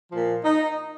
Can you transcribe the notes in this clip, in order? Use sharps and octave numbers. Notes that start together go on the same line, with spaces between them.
A#2 F3
D#4